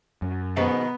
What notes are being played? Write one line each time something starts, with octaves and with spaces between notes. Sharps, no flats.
F#2
G#2 B2 D#3 B3 D#4